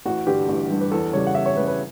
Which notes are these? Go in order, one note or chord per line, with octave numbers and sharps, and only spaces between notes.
A1 F#4
G2 D3 G3 G4
A1
G2 D3 G3
B4
E2 A4
C#3 G3 C#5
F#5
E2 E5
C#5
C#3 G3 B4
B4